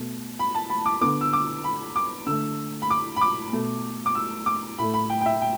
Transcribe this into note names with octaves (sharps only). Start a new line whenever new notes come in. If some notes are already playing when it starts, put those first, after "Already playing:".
Already playing: B2 A3
B5
A5
B5
D6
D3 B3 D6
E6
D6
B5
D6
D3 A3 E6
B5
D6
B5
D6
B2 A3
D6
E6
D6
A2 A3 B5
B5
G5
G5
E5
G5